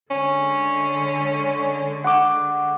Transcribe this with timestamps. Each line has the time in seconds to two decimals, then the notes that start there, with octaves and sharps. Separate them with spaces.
0.11 D3 G#3 C#4
2.04 F#5 C#6 D6